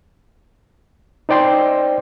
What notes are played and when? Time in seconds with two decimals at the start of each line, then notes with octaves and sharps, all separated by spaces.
1.29 D#4 C5 D5 G5 C6